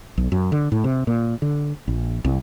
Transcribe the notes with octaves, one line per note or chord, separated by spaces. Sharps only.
B1
F#2
D3
A2
C3
A#2
D3
A#1
C2